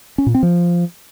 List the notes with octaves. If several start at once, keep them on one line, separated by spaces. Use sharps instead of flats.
C#4
A#2
C4
F3